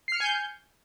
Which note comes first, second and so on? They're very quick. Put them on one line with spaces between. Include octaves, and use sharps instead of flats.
C7 F6 C#7 G#5 G6